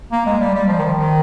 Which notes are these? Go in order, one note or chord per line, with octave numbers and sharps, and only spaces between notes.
A#3
G#3
G3
G3
F3
D#3
F3
D#3